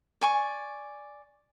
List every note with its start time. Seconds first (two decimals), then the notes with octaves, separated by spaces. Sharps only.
0.21 D5 G#5 C#6